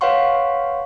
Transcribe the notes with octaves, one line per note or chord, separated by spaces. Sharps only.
B4 C#5 F5 F#5 C6 C#6